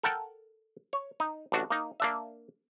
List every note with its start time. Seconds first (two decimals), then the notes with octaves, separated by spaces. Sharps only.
0.03 A4 A#4 F#5 G5 A5
0.93 C#5
1.20 D#4
1.52 A1 D4 F#4
1.70 A#3 D#4
2.00 A#3 D4 E5